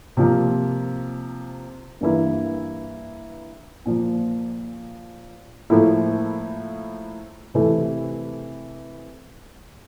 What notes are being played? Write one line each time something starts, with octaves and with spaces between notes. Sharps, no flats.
C3 F3 A#3
G2 E3 A#3 E4
A#2 F3 A#3
A2 F3 A#3 E4
C3 E3 A3 E4